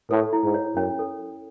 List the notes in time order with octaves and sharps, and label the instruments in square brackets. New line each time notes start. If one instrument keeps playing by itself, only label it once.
[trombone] A2 [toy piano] A4
[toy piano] E4
[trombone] G#2
[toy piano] C#5
[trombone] F#2 [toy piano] C#4
[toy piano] A4